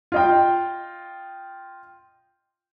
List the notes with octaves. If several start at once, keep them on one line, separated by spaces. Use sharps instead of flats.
F4 D#5 G5